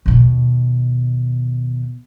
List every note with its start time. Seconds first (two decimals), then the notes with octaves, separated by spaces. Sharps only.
0.06 D#2 B2